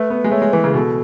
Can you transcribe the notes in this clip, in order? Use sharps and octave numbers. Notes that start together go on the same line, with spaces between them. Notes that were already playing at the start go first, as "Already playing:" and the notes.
Already playing: A3 B4
B3
G#3
A3 C#5
G#3
E3 B4
C#3
B2 A4